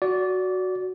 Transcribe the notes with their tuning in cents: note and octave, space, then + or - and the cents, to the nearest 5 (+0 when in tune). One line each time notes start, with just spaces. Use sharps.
F#4 +0 D5 -20